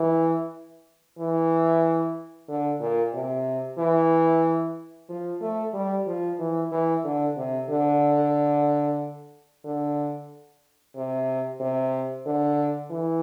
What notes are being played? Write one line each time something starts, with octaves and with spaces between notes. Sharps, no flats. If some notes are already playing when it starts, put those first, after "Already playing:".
Already playing: E3
E3
D3
A#2
C3
E3
F3
A3
G3
F3
E3
E3
D3
C3
D3
D3
C3
C3
D3
E3